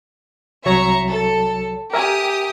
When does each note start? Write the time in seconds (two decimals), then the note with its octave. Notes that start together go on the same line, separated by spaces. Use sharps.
0.66 C2 F#3 C#5 E5 A#5 C#6
1.09 A4
1.94 G4 A#4 E5 G#5 D#6